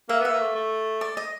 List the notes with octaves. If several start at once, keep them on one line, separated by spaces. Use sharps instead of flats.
A#3 E5
B3
E5
A#3
A3
A3
D5
D#5